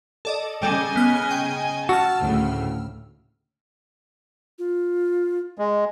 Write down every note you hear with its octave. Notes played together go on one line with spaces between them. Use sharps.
A4 D5 D#5
C#3 G3 A4 D#5 G#5
B3 F6
G5
F#4 A5 E6 F6
D2 A2 C#3
F4
G#3